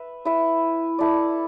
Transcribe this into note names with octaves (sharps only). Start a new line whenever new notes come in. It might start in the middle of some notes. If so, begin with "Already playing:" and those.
Already playing: B4 E5
E4 B4 E5
E4 A4 D5